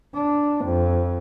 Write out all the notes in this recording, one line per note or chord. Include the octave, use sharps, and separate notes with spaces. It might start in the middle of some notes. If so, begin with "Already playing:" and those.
D4
F2